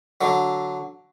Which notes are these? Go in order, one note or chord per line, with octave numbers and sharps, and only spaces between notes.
D3 F#3